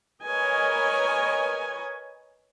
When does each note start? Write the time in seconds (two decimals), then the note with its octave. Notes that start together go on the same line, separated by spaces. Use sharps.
0.22 A#4 B4 C#5 D#5 G#5